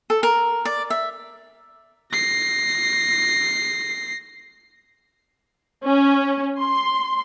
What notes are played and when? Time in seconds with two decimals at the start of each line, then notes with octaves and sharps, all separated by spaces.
0.10 A4
0.23 A#4
0.65 D5
0.90 E5
2.12 A#6 C7
5.84 C#4
6.60 C6